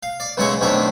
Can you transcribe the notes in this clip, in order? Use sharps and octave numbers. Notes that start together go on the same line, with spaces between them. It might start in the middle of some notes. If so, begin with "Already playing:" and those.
F5
D5
B1 C#3 G#3 E4 G#4 C#6
B1 F2 A2 D#3 D4 E5